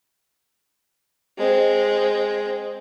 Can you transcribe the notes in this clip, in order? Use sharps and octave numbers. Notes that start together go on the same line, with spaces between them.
G#3 C4